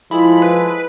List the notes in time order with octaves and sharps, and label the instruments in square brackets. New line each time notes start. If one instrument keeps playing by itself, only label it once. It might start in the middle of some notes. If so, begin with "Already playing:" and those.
[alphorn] F3 [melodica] G#3 G#4 A4 [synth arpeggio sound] E4 [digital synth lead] B5
[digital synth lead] B4